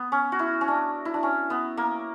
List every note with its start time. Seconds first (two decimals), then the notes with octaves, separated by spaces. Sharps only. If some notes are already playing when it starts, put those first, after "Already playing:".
Already playing: B3
0.12 C#4
0.32 F#4
0.39 E4
0.61 C#4
0.68 D4
1.05 E4
1.14 D4
1.23 C#4
1.50 B3
1.77 A#3